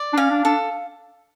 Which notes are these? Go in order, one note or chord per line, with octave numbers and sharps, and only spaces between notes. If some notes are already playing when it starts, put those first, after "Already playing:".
Already playing: D5
D4
C#4 F5
D4
D4 A4